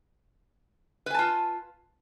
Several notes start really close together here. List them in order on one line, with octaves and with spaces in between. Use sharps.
B4 G#5 A5 F4